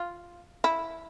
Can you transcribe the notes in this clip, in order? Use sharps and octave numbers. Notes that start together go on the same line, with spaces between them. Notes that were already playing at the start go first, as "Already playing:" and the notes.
Already playing: F4
E4